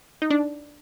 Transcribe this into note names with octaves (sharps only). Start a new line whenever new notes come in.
D#4
D4